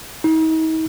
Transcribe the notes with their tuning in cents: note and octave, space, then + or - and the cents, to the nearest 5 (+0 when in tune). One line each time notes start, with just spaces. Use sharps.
D#4 +40